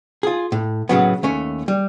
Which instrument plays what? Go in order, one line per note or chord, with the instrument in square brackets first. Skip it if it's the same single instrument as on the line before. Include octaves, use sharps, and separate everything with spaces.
[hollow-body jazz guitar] F4 G#4
A2
A2 C#3 F#3 B3
D#2 A3 C#4
G3